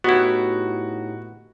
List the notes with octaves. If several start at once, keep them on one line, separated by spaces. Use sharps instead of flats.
A2 B3 D#4 E4 F#4 G4